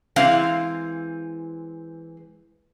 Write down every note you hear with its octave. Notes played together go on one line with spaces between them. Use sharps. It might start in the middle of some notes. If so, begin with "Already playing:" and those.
E3 G#3 C4 F5